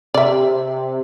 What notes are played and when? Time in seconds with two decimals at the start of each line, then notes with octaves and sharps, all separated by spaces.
0.14 C3 D5 E5